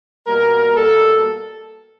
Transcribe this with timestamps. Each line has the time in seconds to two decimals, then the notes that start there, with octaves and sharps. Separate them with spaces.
0.27 B2 G3 A#3 A#4
0.76 B2 G3 A#3 A4